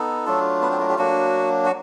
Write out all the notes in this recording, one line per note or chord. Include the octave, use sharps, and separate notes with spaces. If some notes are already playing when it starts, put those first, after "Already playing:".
Already playing: B3 D#4 A4
F#3 A3 D4 F4
B3 B4
C4 C5
A#3 A#4
G4
F#3 A#3 D4 F#4
F#4